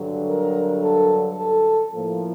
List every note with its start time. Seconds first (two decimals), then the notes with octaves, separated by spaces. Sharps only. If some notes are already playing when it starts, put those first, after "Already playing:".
Already playing: G2 D3 F#3
0.26 A#4
0.81 A4
1.37 A4
1.92 A2 F3 A#3